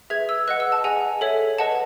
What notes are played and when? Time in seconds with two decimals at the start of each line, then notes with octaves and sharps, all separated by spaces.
0.10 G#4 B4 E5 G#6
0.29 E6
0.48 B4 D#5 F#5 F#6
0.60 E6
0.72 A5
0.84 G#4 D#5 F#5 G#5
1.21 A4 C#5 E5
1.58 B4 D#5 F#5 A5